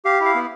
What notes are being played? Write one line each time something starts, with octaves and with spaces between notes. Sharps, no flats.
G4 F5
E4 F5
B3